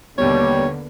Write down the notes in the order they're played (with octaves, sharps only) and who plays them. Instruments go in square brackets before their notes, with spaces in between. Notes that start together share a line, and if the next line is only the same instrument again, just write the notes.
[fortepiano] D#2 B2 [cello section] D3 A#3 B3 [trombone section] G3 [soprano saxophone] C#5